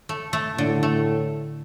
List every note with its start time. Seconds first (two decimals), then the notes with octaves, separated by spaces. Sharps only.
0.09 A3
0.33 A3
0.58 A2 D3
0.83 A3